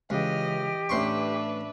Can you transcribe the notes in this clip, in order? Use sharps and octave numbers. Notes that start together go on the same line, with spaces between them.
C#2 E3 G4 D#5 F6
A1 D4 B4 E5 C6 C#6